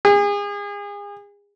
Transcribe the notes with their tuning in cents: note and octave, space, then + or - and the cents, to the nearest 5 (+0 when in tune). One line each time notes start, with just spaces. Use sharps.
G#4 -35